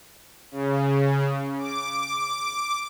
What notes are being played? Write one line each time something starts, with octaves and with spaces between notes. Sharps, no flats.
C#3
D6